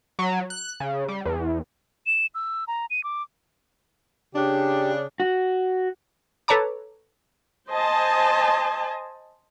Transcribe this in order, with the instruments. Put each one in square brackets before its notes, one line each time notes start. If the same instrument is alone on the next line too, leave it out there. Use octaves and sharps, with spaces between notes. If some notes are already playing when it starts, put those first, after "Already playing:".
[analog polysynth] F#3
F#6
C#3
G3
E2
[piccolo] E7
E6
A#5
D#7
D6
[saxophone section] C#3 D4 [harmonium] G4
[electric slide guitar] F#4
[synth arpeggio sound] A4 B4 C#5 A5 A#5 D6
[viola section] C5 D#5 G#5 A5